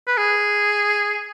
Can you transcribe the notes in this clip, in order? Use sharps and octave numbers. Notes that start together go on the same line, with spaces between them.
B4
G#4